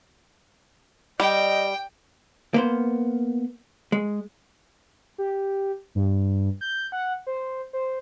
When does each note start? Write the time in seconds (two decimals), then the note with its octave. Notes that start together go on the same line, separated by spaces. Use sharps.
1.20 G3 D#5 G5
2.54 A#3 B3 C5
3.92 G#3
5.18 G4
5.95 G2
6.61 G6
6.92 F#5
7.27 C5
7.73 C5